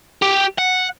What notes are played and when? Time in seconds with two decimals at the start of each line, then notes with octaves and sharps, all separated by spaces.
0.22 G4
0.58 F#5